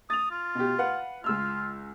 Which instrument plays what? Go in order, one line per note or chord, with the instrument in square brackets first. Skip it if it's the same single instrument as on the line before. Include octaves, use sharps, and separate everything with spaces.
[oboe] D#6 [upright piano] A6 F7
[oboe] F4
[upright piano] B2 G4
B4 F5 F#5
[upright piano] C#2 E6 F6 [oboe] F4